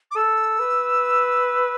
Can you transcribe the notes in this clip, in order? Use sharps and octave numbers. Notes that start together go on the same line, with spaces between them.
D6
A4 E6
B4